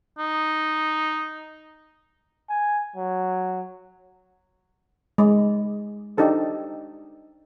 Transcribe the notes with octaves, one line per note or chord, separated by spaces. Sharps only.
D#4
G#5
F#3
G#3
D4 D#4 G4 A4 C5